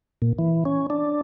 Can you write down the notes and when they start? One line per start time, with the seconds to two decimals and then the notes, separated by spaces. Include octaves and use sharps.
0.22 A#2
0.39 E3
0.65 C#4
0.90 D4